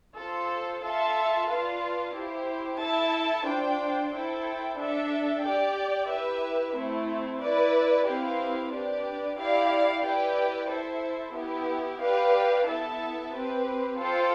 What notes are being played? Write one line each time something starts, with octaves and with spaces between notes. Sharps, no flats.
F4 A4 C5
F4 A4 E5 A5
F4 B4 D5 F5 A5
E4 G4 C5
E4 A4 E5 A5
D4 F4 C5 G5
E4 A4 C5 G5
D4 A4 E5
G4 D5 G5
E4 G4 B4 E5
A3 C4 E4
E4 B4 D5
C4 E4 G4 B4 F5
D4 G4 B4 D5
E4 G4 D5 F5
E4 G4 B4 D5 G5
E4 A4 C5 E5
B3 E4 G4
G4 B4 D5 F5
B3 E4 A4 E5 A5
C4 G4 B4
F4 A4 C5 G5